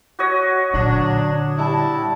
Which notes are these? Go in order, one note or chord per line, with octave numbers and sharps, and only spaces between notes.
F#4 C#5 D#5
A#2 D3 F#3 D4
G3 E4 A5